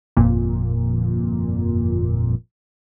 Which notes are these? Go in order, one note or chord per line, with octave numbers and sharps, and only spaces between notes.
G1 F2 A#2